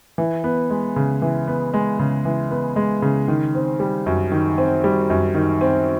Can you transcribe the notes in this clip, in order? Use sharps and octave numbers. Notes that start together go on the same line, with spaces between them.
E3
B3
G#3
C#3
E3
B3
G#3
C#3
E3
B3
G#3
C#3
D#3
C4
G3
F#2
D#3
C4
G3
F#2
D#3
C4